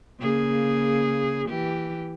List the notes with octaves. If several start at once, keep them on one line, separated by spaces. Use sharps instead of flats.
C#3 A#3 G#4
E3 G4